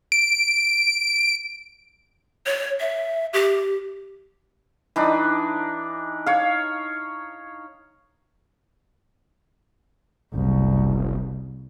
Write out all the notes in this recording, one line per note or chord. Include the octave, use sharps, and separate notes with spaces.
D7
C#5
E5
G4
E3 D4 D#4
C#5 F5
F#1 C2